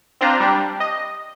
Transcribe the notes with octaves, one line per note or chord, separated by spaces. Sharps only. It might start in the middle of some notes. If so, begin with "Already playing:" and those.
C4 D4 F4 C5 A#5
G3 D4 G4
D#5